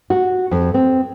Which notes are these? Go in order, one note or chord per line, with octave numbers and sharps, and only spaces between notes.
F#4
F2
C4